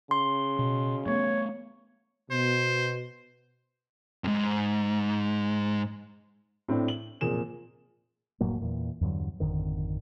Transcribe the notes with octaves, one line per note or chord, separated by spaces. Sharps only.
C#3 C6
B2
G2 A3 B3 C#5
B2 C5
F2 G#2
A2 C4 D4
F#7
F1 A#2 G#4 E7
F1 A2 F#3 A#3
E2 A#2
E2 G2 D3 F#3
G#1 F2 D3 D#3